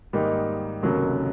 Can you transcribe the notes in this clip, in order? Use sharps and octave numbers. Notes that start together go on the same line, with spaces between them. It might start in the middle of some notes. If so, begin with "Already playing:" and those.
G#2 D#3 G3 A#3 D#4
F1 D#2 C#3 F#3 A#3